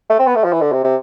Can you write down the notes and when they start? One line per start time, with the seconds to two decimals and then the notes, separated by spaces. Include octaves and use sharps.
0.09 A3
0.19 C4
0.27 B3
0.35 A3
0.44 F3
0.52 E3
0.61 D3
0.72 C3
0.84 C3